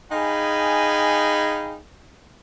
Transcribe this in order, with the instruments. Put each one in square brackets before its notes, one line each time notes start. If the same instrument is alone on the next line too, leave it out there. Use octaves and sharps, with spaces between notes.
[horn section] D#4 G#4 F5 G5 G#5 B5